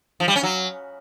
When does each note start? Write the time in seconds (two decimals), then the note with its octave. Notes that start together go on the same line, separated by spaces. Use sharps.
0.20 F3
0.28 G3
0.36 C#4
0.43 F#3